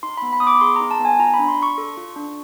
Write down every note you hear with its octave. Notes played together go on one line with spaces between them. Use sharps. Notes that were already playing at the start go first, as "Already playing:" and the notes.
D#4 C6
B3 B5
B5
B3 D#6
D6
G#4 C6
D#4 A#5
A5
B3
G#5
F4 A#5
B5
D4
C6
D4 C#6
A4
F4
D4